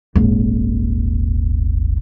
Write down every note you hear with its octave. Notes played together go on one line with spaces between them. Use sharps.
D#1 G#1